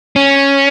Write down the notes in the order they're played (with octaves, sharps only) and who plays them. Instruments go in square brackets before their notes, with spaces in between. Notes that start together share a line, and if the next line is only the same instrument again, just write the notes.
[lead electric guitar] C#4